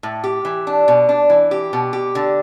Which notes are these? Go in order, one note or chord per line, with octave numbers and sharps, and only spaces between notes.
A2
G4
E3
D4
B2
D4
E3
G4
B2
G4
D3